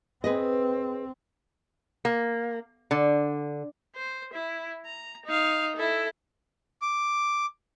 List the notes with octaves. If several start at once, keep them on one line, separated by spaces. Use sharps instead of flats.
C4 G#4 B4 D#5
A#3
D3
C5
E4
A#5
D#4 F5
E4 A4
D6